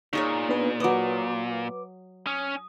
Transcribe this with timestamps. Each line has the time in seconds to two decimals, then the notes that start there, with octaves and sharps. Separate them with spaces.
0.13 A#2 D#4 G#4 C#5 C#6
0.49 B3 D4 B4
0.80 F#3 B4 D#5 D6
2.27 C#4 D#6